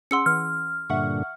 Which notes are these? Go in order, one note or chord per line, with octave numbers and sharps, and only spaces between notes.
C#4 G#4 F#5 C6 E6 C#7
E3 F6
G2 A#2 D3 E5 F#5 C#6